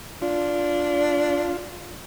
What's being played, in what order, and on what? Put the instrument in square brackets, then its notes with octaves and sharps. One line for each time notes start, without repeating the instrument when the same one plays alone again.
[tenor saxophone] D4 [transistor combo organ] F4